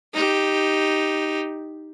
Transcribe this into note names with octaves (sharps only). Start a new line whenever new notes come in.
D#4 G4